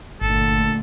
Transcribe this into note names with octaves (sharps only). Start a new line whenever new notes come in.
G1 A#2 D3 A3 A4